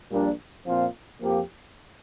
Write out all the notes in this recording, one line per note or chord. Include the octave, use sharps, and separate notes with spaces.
A#1 A#2 G3 D4 A#4
A#2 F3 C4 F4
F2 F3 A#3 G4